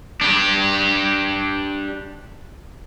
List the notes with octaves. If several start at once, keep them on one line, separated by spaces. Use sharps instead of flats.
D4 G4